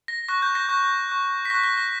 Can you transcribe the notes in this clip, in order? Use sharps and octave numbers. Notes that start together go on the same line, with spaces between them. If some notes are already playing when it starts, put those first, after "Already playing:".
A#6
C#6 F#6 A#6
G6
A#6
C#6 F#6 G6
C#6 F#6
B6
C#6 F#6 A#6
A#6
A#6